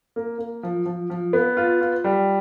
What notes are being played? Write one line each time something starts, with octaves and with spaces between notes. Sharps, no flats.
A#3
A#3
F3
F3
F3
B3
F4
F4
G3